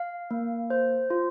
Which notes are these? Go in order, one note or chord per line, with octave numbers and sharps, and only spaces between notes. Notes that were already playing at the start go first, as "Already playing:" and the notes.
Already playing: F5
A#3
C5
F4